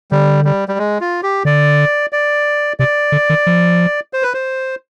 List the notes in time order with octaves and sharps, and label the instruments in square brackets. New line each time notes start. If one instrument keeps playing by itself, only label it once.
[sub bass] D3 [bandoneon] G3
[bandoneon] G3
G3
G#3
F4
G4
[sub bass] D3 [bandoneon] D5
[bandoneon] D5
[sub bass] C3 [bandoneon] D5
[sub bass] D3
D#3
F3
[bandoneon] C5
B4
C5